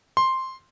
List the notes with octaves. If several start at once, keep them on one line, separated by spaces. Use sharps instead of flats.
C6